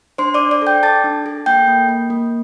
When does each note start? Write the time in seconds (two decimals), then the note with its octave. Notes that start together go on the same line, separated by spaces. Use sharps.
0.18 D4 C5 C6
0.34 D5 D6
0.40 D4
0.51 D5 D6
0.62 A4 G5 G6
0.83 A4 A5 A6
1.04 D4
1.26 A4
1.46 A#3 G5 G6
1.68 A#3
1.89 A#3
2.10 A#3